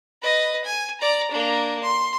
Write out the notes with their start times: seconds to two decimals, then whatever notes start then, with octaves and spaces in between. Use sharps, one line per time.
0.22 B4 D#5
0.65 G#5
1.01 D5 A#5
1.31 A#3 D4
1.84 C6